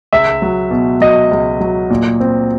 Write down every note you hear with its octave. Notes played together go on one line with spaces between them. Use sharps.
C#2 E5
F#3
B2
F#3 D#5
C#2
F#3
A#2
C4